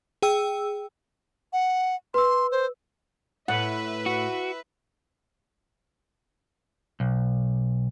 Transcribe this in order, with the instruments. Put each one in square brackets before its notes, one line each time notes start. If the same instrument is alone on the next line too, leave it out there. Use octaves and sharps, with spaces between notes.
[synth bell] G#4 G5 E6
[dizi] F#5
[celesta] B4 E6 [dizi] C6
[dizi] C5
[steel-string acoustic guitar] A2 [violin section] B4 E5 [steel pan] F#5
[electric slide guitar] F#4
[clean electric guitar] B1